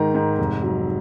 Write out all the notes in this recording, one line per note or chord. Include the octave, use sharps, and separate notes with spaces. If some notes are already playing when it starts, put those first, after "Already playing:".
Already playing: G#2 D#3 A#5
G#2
F1
F#3